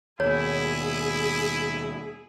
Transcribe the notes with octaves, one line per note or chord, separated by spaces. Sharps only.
D#2 B2 E4 G#4 C#5